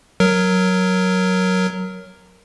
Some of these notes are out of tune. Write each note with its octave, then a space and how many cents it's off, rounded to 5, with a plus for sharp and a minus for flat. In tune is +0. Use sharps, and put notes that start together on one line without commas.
F#3 +0 A#4 +0